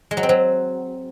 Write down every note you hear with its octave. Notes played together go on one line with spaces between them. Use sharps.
G#3
F#3
C4
F#3